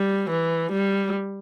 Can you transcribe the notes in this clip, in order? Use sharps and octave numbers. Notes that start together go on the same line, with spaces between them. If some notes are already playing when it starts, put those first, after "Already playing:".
Already playing: G3
E3
G3